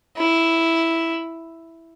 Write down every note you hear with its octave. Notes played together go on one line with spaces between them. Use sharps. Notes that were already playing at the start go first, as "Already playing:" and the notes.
E4